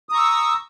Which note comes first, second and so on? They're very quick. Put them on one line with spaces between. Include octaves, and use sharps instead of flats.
D#6 A#5 C#6 E6